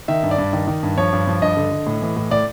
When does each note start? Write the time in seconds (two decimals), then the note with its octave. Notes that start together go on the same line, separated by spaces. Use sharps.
0.08 D#3 E5
0.23 G2
0.31 D5
0.38 G2
0.53 D#3
0.68 D#3
0.83 G2
0.98 F3 C#5
1.13 G2
1.27 F3
1.42 G2 D#5
1.57 D3
1.71 D3
1.87 A2
2.02 E3
2.17 A2
2.31 A2 D5